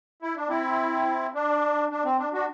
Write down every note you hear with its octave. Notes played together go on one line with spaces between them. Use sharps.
E4
D4
C4 E4
D4
D4
C4
D4
D4 F#4